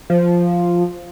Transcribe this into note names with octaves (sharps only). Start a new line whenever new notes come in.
F3